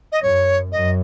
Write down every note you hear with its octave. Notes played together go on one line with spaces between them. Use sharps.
D#5
F#2 C#5
F#2 D#5